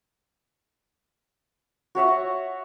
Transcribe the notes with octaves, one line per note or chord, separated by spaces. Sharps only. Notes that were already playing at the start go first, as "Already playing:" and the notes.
F#4 C#5 E5 F#5